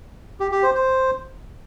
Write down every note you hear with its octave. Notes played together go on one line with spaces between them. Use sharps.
G4
G4
C5
C5